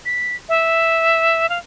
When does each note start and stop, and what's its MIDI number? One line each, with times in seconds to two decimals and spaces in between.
0.06 0.36 95
0.49 1.49 76
1.49 1.58 77